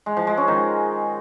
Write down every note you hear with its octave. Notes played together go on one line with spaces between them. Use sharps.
G#3
F3
G#3
C#4
D#3